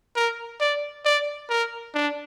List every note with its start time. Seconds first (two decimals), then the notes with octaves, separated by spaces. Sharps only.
0.16 A#4
0.61 D5
1.05 D5
1.50 A#4
1.94 D4